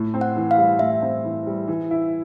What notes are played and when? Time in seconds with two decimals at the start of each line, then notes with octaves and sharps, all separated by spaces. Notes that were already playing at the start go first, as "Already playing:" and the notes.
Already playing: A2
0.14 C4
0.21 F#5
0.36 E3
0.51 F5
0.58 G3
0.79 A2 E5
1.02 C4
1.24 E3
1.47 G3
1.68 E3
1.91 E4